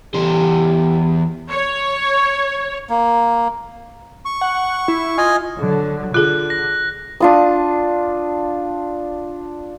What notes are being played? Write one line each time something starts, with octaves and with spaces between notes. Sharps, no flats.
E2 G4 C5
C#5
A#3
C#6
F#5
E4
F4 D#5 G#5
D3 F#3
D3 F4 G#4 F#6
A#6
D4 F4 D#6